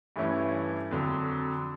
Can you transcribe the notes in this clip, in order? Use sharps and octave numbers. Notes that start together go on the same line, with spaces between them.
G2 E3 A3 C#4 E4
F2 D3 F#3